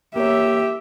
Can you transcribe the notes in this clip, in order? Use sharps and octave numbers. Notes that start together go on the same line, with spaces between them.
A#3 G4 C#5 E5